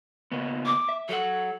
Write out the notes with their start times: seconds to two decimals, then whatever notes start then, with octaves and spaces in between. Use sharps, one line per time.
0.32 C#3 A#3 B3
0.66 D6
0.89 E5
1.09 F#3 A4 F#5